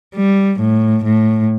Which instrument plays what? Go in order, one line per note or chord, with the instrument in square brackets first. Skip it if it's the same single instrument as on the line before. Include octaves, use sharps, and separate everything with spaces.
[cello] G3
A2
A2